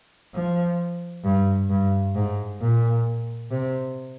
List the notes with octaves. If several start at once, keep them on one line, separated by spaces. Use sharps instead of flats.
F3
G2
G2
G#2
A#2
C3